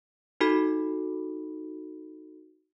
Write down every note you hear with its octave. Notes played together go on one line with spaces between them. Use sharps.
D#4 F#4 A4 B5